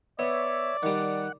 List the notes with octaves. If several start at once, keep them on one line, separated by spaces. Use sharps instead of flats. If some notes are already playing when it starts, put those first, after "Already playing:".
B3 C#5 D5 E5
D#3 G3 F#5